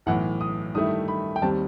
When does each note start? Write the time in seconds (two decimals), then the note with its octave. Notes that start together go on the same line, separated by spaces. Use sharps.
0.06 B1 A2 E3 F#5
0.41 D#6
0.74 G2 D#3 A3 E4 D#6
1.08 B5
1.36 G5
1.42 D#2 D#3 G3 C4 A5